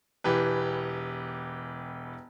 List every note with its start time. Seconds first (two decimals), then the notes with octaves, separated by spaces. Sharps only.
0.24 E1 E3 G4 B4